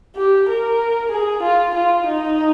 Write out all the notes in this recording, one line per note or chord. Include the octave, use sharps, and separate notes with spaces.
G4
A#4
G#4
F4
F4
D#4